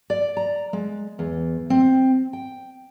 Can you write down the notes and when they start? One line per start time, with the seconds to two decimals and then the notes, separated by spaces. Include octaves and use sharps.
0.10 D5
0.37 A#5
0.73 G#3
1.19 E2
1.70 C4
2.33 G5